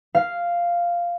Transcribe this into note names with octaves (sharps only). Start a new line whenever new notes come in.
F5